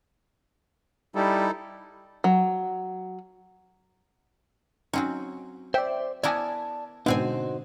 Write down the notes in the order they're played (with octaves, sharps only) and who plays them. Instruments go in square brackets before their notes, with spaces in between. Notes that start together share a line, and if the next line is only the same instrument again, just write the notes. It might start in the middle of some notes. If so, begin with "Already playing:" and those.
[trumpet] G3 [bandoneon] D#4 E4 A4
[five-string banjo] F#3
[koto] F#3 C4 C#4 [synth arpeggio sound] D#4
[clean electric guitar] C5 D5 [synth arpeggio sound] E5 G5
[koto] B3 E4 A#4 [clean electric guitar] D5 A5 [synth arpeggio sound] G#5 D6 G#6
[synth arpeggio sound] G#2 B2 [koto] D3 C4 G#5 [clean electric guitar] D#4 F#4 C5